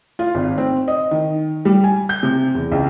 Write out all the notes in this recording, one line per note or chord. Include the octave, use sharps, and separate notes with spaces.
F4
G#1
C4
D#5
D#3
G3
G#5
G6
C3
E2
C#2